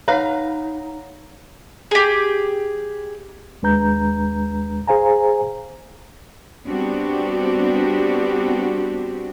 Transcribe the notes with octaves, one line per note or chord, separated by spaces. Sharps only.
D#4 B4 C#5 F5 F#5 A#5
G4 G#4
D#2 G#3 D4 B4 A#5 G6
G#4 C5 F5 G#5 A#5
G3 B3 C4 D4 F#4 G4